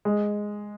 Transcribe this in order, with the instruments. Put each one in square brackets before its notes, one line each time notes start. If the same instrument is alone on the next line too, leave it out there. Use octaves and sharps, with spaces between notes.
[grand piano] G#3